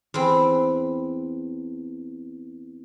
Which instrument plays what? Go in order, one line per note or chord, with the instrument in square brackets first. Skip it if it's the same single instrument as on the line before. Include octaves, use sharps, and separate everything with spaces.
[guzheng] E2 C4